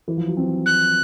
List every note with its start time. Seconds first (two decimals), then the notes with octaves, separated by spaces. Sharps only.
0.08 E3
0.17 F3
0.27 F#3
0.37 C4
0.66 F#6